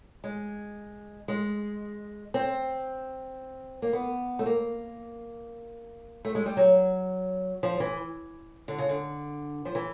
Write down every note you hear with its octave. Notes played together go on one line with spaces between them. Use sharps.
G#3
G#3
C4
A#3
B3
A3
A#3
A3
G#3
G3
F#3
F3
E3
D3
C#3
D3
F3
E3